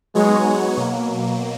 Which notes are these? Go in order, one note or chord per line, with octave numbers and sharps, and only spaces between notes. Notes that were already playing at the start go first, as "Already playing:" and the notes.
F#3 G#3 B3 D#4 F#4 C#5
B2 F#3 A#3